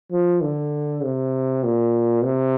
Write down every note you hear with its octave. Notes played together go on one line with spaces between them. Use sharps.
F3
D3
C3
A#2
C3